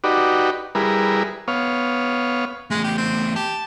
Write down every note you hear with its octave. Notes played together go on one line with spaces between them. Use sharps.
D#4 F#4 G4 B4 D5
G3 E4 G#4 A#4 B4
B3 C#5 F5
E2 G#3 A3
G4
C4
G4 A5